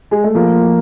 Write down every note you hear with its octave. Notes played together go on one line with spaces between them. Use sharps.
G#3
A3
F3 A#3
F3